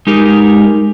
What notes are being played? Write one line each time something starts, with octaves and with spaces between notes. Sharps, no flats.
G#3 D#4 G4 A#4